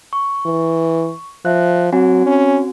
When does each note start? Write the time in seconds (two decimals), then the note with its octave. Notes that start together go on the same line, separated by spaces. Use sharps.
0.13 C#6
0.46 E3
1.45 F3 E5 F#6
1.92 F#3 C4 F#4 G#5
2.26 C#4